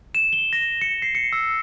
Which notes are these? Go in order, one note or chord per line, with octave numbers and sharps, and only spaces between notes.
E7
G7
A#6
C#7
C7
C#7
E6